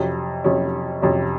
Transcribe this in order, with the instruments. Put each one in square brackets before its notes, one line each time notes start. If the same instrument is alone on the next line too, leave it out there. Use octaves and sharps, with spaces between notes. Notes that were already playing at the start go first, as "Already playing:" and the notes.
Already playing: [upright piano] F2 C3 F#3 C#4
F2 C3 F#3 C#4
F2 C3 F#3 C#4